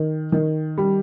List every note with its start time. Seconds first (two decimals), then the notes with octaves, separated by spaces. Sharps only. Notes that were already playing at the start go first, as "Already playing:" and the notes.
Already playing: D#3
0.32 D#3
0.78 G3